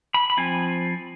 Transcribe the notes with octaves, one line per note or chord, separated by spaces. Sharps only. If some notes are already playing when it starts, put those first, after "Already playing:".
B5
B5
F3 C4 G#5